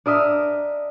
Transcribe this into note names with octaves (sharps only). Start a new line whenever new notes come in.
D4 A#4 D#5 E5